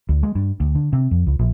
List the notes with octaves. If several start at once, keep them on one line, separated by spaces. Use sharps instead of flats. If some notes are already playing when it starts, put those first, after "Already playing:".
D2
G#3
G2
D2
D3
C3
F2
C#2
A#1